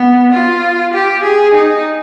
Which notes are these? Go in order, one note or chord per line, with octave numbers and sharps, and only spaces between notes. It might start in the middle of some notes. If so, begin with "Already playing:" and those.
Already playing: B3
F4
G4
G#4
D#4